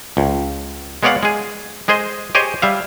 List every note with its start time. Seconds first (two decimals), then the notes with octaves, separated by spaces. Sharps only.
0.17 C#2
1.03 G#3 B3 C#5 D5 F5 F#5
1.23 G#3 G#4
1.88 G#3 G#4 C5 D#5
2.35 G4 G#4 C5 C#5 D#5 G#5
2.62 G3 E5 F5